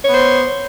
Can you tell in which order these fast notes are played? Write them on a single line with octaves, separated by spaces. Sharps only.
C#5 B3 C5